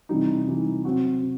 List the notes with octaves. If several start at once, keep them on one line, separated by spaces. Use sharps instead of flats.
C3 E3 G3 D#4
C3 E3 G3 D#4
C3 F#3 C4 F#4
C3